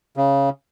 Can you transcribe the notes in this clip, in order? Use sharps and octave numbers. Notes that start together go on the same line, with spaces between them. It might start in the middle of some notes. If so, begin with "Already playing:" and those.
C#3